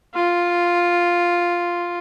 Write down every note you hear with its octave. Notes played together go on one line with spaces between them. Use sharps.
F4